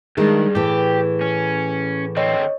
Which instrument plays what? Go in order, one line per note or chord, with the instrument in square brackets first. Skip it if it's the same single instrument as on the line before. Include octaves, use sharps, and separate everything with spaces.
[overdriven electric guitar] D2 G2 [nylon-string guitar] D#3 G#3 [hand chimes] G#4
[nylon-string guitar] A2 E3 [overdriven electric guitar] G4
[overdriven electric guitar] C#4
[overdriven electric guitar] D3 C4 [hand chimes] C#5 D#5